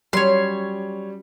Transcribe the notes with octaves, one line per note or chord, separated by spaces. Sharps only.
F#3 G3 C#4 C#5 C6